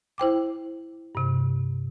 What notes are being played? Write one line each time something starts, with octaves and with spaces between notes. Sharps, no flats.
E4 C5 G5 D6
G2 C3